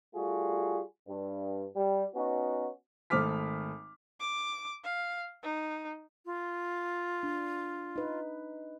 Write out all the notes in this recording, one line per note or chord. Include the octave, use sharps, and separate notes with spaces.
G3 A3 F4 F#4 G#4
G2
G3
B3 C#4 D#4 F#4
G#1 A3 D6 F6 B6
D6
F5
D#4
F4
D4
D#4 B4